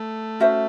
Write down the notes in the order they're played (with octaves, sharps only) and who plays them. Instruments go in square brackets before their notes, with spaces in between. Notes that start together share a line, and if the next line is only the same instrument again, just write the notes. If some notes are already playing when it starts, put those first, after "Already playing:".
Already playing: [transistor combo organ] A3
[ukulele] C#4 F#4 C5 E5